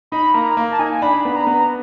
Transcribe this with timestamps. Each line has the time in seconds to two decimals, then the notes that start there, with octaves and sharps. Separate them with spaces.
0.12 D#4 B5
0.34 A#3 A#5
0.57 A#3
0.71 A5
0.79 D#4 G#5
1.02 D4 B5
1.25 B3
1.36 A#5
1.47 B3